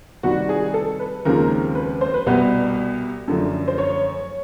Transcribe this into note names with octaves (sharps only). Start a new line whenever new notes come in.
C3 D#3 G3 F#4
G#4
A4
B4
D#2 C#3 F3 G#3 C4 A#4
B4
C5
B4
C2 B2 G3 B3
F#2 D3 F3 A3
C5
C#5